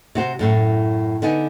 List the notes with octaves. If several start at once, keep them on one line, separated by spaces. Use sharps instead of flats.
C3 F#4 C5
F#2 A2 A3
D3 B3 D#4 G#5